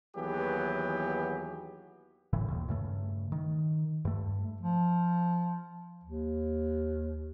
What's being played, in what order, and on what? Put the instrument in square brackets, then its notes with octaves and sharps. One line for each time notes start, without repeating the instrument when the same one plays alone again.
[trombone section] D#2 E3 F#3 B3 G4 G#4
[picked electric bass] G#1 A2 C#3 E3
D#2 A#2
G2 C#3 A3
D#3
G2 A3
[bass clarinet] F3
D#2